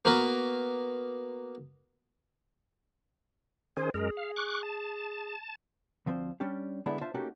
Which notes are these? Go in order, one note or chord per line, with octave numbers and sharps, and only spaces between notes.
A#3 B3 F#4 A#4 B4
D#3 C#4 G#4 C5
F#2 G#3 G#4 A#4
F5
C#6 D6 F#6
A5
D2 F3 C4 C5
G3 C#4 D4 G4
D3 G#3 A3 B3 D4 E4
D4 F4 C5 E5 A5
A3 A#3 C#4 D#4 F#4 G4